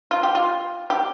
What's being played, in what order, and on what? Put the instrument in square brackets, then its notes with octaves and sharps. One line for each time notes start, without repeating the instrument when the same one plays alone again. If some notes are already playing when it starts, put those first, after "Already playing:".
[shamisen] F4
G4
F4
G4